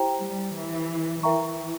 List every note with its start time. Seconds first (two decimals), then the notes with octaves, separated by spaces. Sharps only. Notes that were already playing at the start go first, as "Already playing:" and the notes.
Already playing: E4 G4 C5 G5 A#5
0.19 G3
0.54 E3
1.23 E3 A#4 E5 G5 A#5 C#6